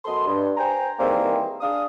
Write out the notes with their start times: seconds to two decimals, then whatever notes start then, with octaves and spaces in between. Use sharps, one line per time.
0.05 F#2 B3 A4 D#5 C6
0.27 G2
0.57 C5 G5 G#5 A#5
0.99 D#3 E3 G3 G#3 A#3 C4
1.61 D4 G#4 F5 D#6